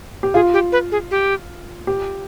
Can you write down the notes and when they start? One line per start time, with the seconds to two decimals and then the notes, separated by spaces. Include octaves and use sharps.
0.23 G4
0.34 F4 G#4
0.53 G4
0.72 B4
0.92 G#4
1.11 G4
1.87 G4